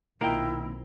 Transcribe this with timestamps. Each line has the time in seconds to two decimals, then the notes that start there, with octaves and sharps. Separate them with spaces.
0.21 B1 A#2 D#3 A#3 C4 E4 A#4 G5